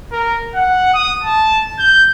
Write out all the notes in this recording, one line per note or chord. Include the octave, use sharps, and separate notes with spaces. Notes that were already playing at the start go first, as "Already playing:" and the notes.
A#4
F#5
D#6
A5
G6